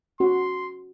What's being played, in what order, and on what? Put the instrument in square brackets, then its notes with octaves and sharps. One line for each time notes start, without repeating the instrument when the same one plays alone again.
[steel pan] C#4 F#4 [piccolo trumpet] C6